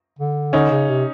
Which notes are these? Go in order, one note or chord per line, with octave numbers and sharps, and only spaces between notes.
D3
D3 C#4 D#4
C#3
C3